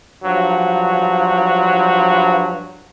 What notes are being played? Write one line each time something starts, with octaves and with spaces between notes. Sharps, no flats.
G2 F3 F#3